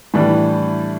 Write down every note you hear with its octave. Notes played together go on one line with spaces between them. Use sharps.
A2 E3 G3 D4 G4